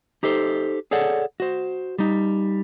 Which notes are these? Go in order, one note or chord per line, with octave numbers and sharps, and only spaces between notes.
D#4 G4 A4 C5
G#4 A4 C#5 D5 F#5
F#4 C5
G3 D#4